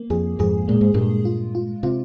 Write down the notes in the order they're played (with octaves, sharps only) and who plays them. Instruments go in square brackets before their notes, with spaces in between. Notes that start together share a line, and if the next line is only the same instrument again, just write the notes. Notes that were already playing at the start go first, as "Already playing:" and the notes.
Already playing: [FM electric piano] A#3
[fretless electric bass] F2 [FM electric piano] G#4
[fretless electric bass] F2 G#2 [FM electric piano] G#4
[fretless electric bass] A#2 [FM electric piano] G#3
[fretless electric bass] G#2
[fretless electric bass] G2 A#2 [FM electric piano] G#3
[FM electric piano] F4
F4
[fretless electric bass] C3 [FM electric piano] F4